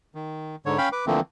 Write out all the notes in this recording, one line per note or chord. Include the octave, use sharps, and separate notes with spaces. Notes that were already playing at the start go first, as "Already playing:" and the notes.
D#3
G#2 D3 C#5
C#4 F5 G5 B5
B4 D6
D3 E3 F3 A3 A#3 C4